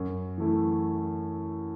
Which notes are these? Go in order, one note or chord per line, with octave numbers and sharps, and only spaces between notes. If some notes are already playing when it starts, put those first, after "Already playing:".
Already playing: F#2
E3 A3 E4